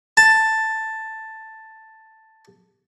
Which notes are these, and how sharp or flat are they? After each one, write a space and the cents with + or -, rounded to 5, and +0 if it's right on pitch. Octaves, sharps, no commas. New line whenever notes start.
A5 +5